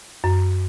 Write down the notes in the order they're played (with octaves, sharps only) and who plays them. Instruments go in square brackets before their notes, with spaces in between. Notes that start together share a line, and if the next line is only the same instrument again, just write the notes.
[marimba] F#2